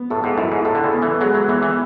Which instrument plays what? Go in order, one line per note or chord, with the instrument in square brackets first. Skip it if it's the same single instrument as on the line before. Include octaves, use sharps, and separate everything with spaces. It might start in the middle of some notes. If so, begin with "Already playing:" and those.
Already playing: [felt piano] B3
[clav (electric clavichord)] A2 [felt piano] A4
[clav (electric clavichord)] G#2
[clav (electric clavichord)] F#2 [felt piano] E4
[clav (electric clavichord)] G#2
[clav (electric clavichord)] A2 [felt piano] A4
[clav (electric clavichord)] D3
C#3
[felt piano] B3
[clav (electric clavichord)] E3
[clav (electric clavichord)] F#3 [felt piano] G#3
[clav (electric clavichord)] F#3
[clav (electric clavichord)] E3 [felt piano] B3
[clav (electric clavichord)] E3